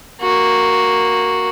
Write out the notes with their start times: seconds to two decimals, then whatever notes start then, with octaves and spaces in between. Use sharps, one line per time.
0.21 A#3 F#4